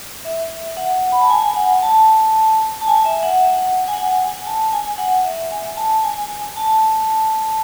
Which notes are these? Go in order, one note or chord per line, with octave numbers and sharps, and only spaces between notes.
E5
F#5
B5
A5
G#5
F#5
A5
A5
G#5
E5
F#5
G#5
F#5
G#5
A5
G#5
F#5
E5
G#5
A5
G#5
G#5
A5